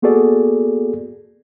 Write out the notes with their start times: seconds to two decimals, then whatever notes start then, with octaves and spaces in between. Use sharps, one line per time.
0.02 A#3 B3 F#4 G#4 A4 D5